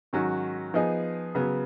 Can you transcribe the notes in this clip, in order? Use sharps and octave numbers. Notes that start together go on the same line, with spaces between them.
G#2 D#3 F#3 C#4 F#4
F3 B3 D#4 G#4
C#3 F#3 B3